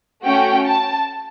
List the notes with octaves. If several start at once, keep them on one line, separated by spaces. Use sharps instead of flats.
A3 C#4 F#4 G5
A5